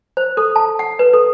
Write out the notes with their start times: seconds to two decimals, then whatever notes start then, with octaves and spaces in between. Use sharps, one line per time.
0.17 C5
0.37 A4
0.56 A5
0.79 F#5
0.99 B4
1.13 A4